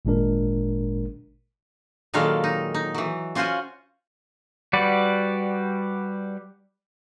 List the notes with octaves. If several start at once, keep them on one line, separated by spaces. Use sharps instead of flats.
G#1 A#2 G#3 D4 A#4
A#2 D#3 F#3 G#3 A4 F5
D#4
D#4
E3 F#3
C#4 F4 F#4 C5 F#5 G#5
G3 F#4 B4 D5